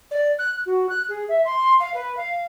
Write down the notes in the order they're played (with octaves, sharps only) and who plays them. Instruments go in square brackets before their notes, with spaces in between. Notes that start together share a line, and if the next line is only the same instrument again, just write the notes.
[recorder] D5
F#6
F#4
F#6
G#4
E5
C6
F5
B4
F5